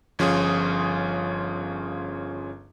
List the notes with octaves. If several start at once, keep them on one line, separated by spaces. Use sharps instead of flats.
G1 F3 C#4 F4 G#4 D#6